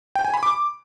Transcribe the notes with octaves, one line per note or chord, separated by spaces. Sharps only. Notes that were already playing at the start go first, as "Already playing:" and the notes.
G5
G#5
B5
D6